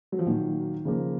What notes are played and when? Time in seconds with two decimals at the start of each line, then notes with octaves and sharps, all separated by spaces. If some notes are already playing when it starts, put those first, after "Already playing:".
0.12 F#3
0.19 F3
0.26 A#2 D#3 F#3 A#3
0.85 C#3 F3 A#3